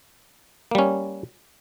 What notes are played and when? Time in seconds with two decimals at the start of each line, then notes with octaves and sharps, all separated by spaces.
0.71 A#3
0.75 G3
0.78 C#4